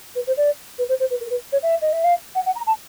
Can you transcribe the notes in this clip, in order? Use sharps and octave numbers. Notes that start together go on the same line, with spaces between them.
B4
C5
D5
B4
C5
C5
B4
A#4
B4
C#5
E5
D#5
E5
F5
F#5
F#5
A#5
A5